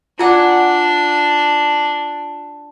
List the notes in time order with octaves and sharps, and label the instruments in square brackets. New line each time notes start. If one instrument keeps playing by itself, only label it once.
[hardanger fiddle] D4 [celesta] F4 [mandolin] D5 F#5 G#5